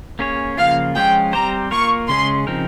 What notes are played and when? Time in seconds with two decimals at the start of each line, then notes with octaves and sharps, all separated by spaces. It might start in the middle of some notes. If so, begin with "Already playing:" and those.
0.19 A#3 C#4 G#4 C#5
0.57 C#3 F3 A#3 F4 F5
0.95 F3 G#3 C#4 F4 G5
1.33 G3 C4 G4 C5 A#5
1.71 A#3 F4 A#4 C#6
2.09 C#3 G#3 C#4 G#4 C6
2.47 C#3 F3 C4 D#4 A#4